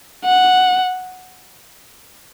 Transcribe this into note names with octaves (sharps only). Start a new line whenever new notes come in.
F#5